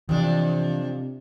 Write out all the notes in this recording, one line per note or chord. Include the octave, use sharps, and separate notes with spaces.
F2 C3 E3 D4